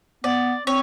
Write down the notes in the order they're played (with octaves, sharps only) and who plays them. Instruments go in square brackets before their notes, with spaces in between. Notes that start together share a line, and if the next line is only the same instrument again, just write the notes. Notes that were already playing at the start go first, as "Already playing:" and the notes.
[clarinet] B3 [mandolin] D5
[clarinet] C4 [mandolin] C#5